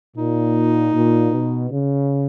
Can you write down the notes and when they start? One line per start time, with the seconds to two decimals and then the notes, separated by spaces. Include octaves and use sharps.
0.16 A#2 D#4
0.94 A#2
1.32 B2
1.70 C#3